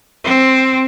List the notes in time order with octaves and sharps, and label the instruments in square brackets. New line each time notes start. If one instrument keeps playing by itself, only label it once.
[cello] C4